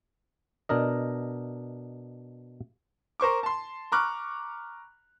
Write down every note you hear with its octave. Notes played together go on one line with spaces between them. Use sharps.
B2 D4 A#4 D#5
A#4 C5 C#6 D6
A5 C6
A#5 B5 C#6 D6 F6 F#6